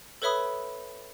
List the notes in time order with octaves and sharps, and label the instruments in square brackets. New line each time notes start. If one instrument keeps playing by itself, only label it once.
[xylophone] A4 B4 C#5 E5 B5 D#6